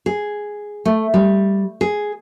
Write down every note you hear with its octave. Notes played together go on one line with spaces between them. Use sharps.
G#4
A3
G3
G#4